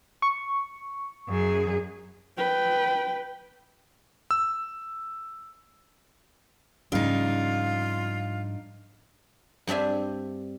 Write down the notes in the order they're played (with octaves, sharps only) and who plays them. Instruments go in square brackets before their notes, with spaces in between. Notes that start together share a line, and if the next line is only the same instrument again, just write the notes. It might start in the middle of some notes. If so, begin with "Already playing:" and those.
[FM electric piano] C#6
[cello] F#2 G#4
[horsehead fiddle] B4 G5
[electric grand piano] E6
[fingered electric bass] G#2 F3 G3 [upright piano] C#3 [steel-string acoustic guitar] D4 D#4 [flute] F4
[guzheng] G2 C4 D4 E5 G#5